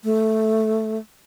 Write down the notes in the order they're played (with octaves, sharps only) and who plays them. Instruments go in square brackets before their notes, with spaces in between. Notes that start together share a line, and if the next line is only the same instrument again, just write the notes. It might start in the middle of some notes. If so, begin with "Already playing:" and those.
[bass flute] A3